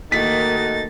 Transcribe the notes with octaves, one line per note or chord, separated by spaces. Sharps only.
D#3 A3 A#3 D#4 F#4 A6 B6